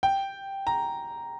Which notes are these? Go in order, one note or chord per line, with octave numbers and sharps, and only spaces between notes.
G5
A#5